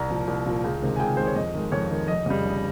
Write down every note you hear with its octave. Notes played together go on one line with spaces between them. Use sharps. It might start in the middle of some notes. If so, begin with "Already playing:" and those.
Already playing: C2 A#5
A#2 F3
C2
A#2 F3
C#2
C3 D#3 G#3
G#5
C#2 G5
C3 D#3 G#3 C5
C#5
F2 D#5
D#3 G#3
F2 C#5
D#3 G#3
F1 D#5
F2 C#3 G3
F1